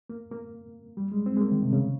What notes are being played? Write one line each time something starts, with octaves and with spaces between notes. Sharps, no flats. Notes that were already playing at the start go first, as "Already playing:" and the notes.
A#3
A#3
G3
G#3
C4
G#3
A#3
D#3
C3
C#3